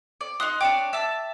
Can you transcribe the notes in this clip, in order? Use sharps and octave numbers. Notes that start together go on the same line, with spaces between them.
D5
D#4 C6 D#6 F#6
D4 C#5 G5 D6
E5 A5